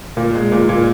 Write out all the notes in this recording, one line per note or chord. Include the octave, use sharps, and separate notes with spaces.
A#2
G#3
A#2
A#2